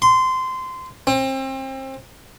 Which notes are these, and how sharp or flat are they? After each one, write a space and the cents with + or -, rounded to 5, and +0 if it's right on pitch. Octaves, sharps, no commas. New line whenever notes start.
C6 -20
C4 +30